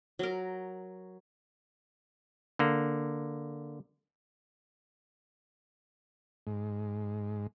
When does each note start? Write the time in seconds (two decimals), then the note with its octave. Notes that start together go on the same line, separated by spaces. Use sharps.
0.19 F#3 A#4
2.59 D3 A#3
6.47 G#2